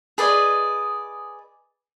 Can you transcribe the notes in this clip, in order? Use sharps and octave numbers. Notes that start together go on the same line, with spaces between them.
G#4 B4 D5 D#5